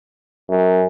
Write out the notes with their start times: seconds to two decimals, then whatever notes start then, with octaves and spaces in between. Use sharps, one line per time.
0.50 F#2